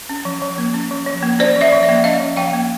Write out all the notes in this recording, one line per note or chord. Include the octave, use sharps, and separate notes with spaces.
C#4
F3
F3
A#3
C#4
F3
F3
A#3
C#4 C5 D5
F3
D5 E5
F3
D5 E5
A#3
C#4 D#5 F5
F3
F3 F5 G5
A#3